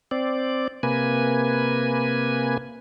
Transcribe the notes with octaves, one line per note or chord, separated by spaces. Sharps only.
C4 D5
C3 A#3 B4 G#5